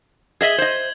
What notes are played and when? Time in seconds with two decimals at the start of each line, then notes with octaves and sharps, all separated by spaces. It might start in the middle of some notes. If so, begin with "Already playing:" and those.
0.41 G#4 D#5 E5 G#6 F#7 G7
0.58 C5 D#5